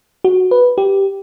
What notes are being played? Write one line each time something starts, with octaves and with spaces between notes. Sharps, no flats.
F#4
B4
G4